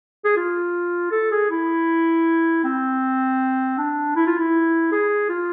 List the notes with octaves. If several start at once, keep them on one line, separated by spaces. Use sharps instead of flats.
G#4
F4
A4
G#4
E4
C4
D4
E4
F4
E4
G#4
F4